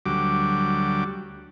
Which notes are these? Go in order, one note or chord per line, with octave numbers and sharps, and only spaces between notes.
D2 F#3 G3 D6